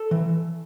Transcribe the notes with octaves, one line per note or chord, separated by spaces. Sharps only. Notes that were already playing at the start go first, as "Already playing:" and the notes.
Already playing: A4
E3